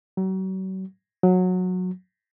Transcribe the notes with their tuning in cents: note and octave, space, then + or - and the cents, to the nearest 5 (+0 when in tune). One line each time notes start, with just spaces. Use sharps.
F#3 +40
F#3 -15